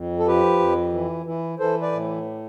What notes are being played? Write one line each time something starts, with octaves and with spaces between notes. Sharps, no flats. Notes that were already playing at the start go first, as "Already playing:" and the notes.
Already playing: F2
A4
F3 G4 B4
F2
E3
E3
E3 A4 C5
B4 D5
A2